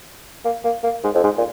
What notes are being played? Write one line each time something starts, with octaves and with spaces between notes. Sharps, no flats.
A#3
A#3
A#3
G#2
F2
G#2
A#2